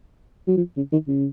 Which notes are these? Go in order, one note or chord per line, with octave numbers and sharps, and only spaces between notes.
F#3
F3
C#3
D#3
C#3